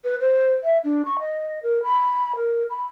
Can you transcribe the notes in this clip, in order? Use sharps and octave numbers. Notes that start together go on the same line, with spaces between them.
B4
C5
E5
D4
C#6
D#5
A#4
B5
A#4
B5